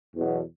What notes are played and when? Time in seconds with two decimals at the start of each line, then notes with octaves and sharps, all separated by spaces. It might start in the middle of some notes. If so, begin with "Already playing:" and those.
0.15 E2 B2 F#3